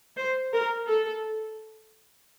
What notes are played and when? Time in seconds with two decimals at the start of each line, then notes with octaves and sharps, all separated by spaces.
0.18 C5
0.53 A#4
0.87 A4